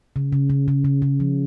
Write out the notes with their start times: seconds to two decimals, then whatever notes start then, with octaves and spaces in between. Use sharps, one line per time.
0.16 C#3
0.32 C#3
0.50 C#3
0.68 C#3
0.85 C#3
1.02 C#3
1.20 F3